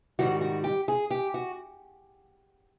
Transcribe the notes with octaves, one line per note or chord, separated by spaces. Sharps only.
G#2 D#3 G3 F#4
F#4
G4
G#4
G4
F#4